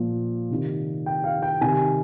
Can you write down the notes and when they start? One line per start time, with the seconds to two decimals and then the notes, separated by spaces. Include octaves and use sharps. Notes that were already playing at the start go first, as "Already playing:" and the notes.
Already playing: A#2 F3
0.50 C3 D#3
1.06 G5
1.24 F5
1.42 G5
1.61 C3 D#3 G#5